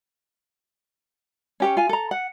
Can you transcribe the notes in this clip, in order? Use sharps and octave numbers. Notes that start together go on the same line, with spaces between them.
C#4 G4 C#5
F4 G#5
A4 A#5
F#5